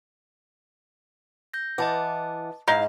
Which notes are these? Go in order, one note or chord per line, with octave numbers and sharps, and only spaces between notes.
G6 A#6
E3 D#5 F#5 A5 D6
G#2 D#4 E4 F5